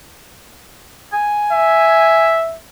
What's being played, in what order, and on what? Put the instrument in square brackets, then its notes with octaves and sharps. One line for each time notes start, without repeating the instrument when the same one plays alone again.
[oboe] G#5
[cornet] E5